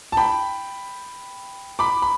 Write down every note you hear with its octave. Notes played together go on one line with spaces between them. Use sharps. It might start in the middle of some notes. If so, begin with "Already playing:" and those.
A5
G5 B5
B5 D6
B5